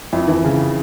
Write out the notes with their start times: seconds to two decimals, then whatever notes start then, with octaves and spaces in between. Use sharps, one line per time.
0.12 F2 E4
0.28 E3
0.45 C#3